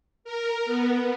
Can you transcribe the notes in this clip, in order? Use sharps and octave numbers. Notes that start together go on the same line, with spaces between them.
A#4
B3